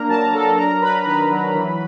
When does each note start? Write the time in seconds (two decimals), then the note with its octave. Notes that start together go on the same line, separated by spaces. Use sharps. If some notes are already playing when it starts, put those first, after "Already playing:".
Already playing: A#3 D4 A#4 A#5
0.08 F#3 A5
0.21 A#5
0.33 F#3 A4 A5
0.57 D4 A#4 A#5
0.82 F#3 B4 B5
1.06 D#3 B4 B5
1.31 F#3
1.55 E3